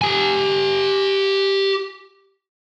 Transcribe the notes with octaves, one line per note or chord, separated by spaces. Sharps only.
G4 G#5